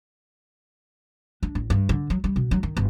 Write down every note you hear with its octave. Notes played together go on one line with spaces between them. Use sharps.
D4
A1
G2
D3
F#3
G3
B2
F#3
D#3
G1